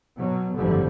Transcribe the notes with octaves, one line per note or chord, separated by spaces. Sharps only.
B2 F#3
G#1 F#2 A2 D3 F3 G3